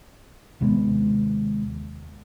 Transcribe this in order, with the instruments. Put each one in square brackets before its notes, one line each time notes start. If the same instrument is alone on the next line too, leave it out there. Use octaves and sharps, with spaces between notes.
[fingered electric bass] D#2 C3 G#3 B3